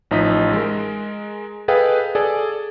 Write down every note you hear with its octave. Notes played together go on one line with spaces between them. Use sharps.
A1 F3 D#4 D#5 E5 B6
G#3 A#4
G#4 A4 B4 D#5 F5 G5
G#4 A4 D5 G#5